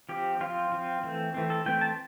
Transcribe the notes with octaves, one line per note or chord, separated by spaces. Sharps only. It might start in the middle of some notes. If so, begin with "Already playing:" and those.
F3 C4 G4
F3 C4 F4
F3 C4
E3 A3 C4
E3 A3 C4
A4
E3 A3 C4 G5
A5